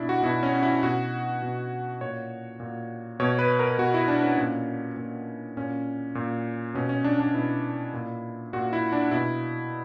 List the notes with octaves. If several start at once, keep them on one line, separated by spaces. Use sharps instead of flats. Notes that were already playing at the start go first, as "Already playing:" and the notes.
Already playing: B2 D4 E4
F#4
B2 E4
C#4
E4
B2 F#4
B2
A#2 C#5
A#2
B2 C#5
B4
A#4
B2 F#4
E4
D4
C#4
A#2
A#2
A#2 C#4
A#2
B2 C#4
C#4
D4
D4
B2 E4
A#2
A#2 F#4
E4
D4
B2 E4